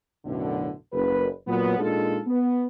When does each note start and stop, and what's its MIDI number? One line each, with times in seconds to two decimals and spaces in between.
0.25 0.71 35
0.25 0.71 42
0.25 0.71 45
0.25 0.71 50
0.93 1.27 30
0.93 1.27 71
1.47 1.78 46
1.47 1.78 54
1.47 1.78 59
1.79 2.21 46
1.79 2.21 56
1.79 2.21 62
1.79 2.21 63
1.79 2.21 65
1.79 2.21 69
2.27 2.67 59